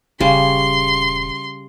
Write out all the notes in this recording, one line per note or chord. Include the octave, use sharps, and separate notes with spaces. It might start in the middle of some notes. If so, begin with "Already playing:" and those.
D#1 C#3 G3 C#4 C6